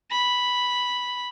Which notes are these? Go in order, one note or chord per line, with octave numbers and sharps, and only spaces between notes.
B5